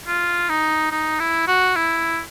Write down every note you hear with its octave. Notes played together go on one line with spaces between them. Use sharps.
F4
D#4
D#4
E4
F#4
E4